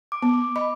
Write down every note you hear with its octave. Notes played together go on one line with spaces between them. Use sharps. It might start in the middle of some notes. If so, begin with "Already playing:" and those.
D6
B3
D6
D#5 B5